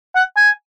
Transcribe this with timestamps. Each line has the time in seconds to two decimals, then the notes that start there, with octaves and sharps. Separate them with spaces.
0.15 F#5
0.36 G#5